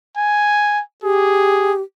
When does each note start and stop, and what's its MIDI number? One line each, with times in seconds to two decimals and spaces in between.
0.17 0.81 80
1.03 1.81 67
1.03 1.73 68